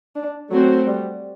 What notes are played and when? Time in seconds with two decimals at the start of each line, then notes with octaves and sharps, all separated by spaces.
0.16 D4
0.51 F#3 A3 C4 F#4 C5
0.87 G3